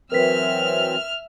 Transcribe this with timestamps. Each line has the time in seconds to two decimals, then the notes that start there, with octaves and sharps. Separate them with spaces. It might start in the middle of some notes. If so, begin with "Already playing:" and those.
0.12 E3 F#3 C4 A#4 B4 E5 F6 B6